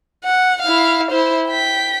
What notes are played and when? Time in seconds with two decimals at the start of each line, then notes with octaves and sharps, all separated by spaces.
0.24 F#5
0.62 E4 F5
1.11 E4 C5
1.49 G5 B6